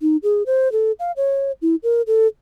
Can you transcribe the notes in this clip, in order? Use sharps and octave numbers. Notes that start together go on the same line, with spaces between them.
D#4
G#4
C5
A4
F5
C#5
E4
A#4
A4